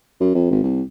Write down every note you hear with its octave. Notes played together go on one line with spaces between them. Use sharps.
F#2
F2
G#1
C2